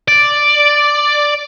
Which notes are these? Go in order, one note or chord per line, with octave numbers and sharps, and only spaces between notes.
D5